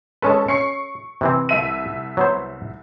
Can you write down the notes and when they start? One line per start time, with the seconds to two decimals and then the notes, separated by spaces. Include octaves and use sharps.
0.22 G#3 C#4 A4 B4 A5 C#6
0.48 C#4 C#6 C7 C#7
1.21 C3 E3 C4
1.49 C2 E5 D#7
2.17 F#3 B3 C5